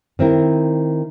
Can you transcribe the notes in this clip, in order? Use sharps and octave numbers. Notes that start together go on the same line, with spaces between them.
D#3 C4 E4 A#4